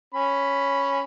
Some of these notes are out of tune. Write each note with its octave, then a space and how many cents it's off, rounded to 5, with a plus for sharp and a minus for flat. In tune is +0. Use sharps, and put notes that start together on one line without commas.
C#4 +0 B5 +0